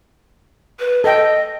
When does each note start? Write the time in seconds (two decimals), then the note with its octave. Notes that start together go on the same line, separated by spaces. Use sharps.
0.79 B4
1.04 A4 D#5 G5